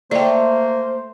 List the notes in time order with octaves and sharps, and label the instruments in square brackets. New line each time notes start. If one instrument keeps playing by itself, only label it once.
[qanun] A3 [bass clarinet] A#3 [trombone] C5 [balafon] D5 D#5 G5